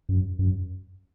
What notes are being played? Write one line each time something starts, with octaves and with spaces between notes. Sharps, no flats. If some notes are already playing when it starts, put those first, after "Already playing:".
F#2
F#2